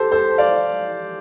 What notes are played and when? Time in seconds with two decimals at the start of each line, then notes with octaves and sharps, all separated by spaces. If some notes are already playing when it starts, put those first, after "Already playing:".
Already playing: G4 A4 C5
0.12 A4 C5
0.38 D5 F5